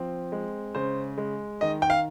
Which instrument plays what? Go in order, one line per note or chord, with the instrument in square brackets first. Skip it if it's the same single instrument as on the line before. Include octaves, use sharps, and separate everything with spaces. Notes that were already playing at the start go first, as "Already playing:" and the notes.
Already playing: [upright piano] F3 C4
G#3
C#3 C5
G#3
D#3 D#5
G5
F5